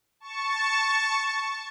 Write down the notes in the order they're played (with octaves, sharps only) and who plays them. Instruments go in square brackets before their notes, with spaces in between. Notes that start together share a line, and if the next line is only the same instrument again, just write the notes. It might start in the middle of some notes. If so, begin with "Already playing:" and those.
[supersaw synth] A5 C#6